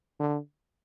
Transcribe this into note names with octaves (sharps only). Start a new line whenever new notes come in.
D3